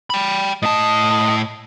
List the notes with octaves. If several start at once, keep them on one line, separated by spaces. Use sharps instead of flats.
G5 B5
A2 D#5 A5